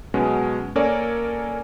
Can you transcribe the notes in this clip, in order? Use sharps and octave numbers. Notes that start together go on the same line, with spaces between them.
B2 F#3 G#3 B3 C#4
A#3 C#4 A4 A#4 C#5 D5